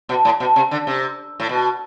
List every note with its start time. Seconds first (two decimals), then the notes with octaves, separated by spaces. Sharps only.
0.09 B2
0.25 A2
0.40 B2
0.56 C3
0.71 D3
0.87 C3
1.40 A2
1.49 B2